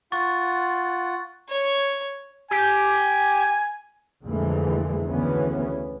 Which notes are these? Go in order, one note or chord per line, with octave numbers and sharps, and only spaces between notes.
F4 F#5 C#6 A6
C#5
G4 G#5
F2 A#2 D3 E3 G#3 A3
D2 C#3 E3 B3 C#4